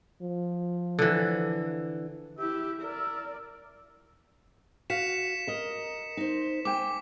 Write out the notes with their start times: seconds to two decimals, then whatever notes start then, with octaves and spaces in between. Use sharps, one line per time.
0.22 F3
0.99 D3 E3
2.39 E4 G4 E5
2.82 A#4 D5
4.90 F#4 F5 B6 C#7 E7
5.47 A#4 D#5
6.17 D#4 C5
6.65 A#3 G5 G#5 D6